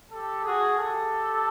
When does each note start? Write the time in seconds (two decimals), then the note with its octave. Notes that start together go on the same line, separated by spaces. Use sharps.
0.10 G4 A4
0.43 F#4 G#4
0.77 G4 A4